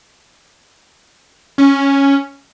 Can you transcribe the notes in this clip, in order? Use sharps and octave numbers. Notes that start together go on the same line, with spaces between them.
C#4